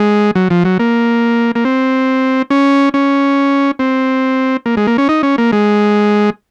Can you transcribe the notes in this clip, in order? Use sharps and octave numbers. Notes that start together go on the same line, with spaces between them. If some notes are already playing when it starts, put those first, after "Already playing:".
Already playing: G#3
F#3
F3
F#3
A#3
A#3
C4
C#4
C#4
C4
A#3
G#3
A#3
C#4
D#4
C#4
A#3
G#3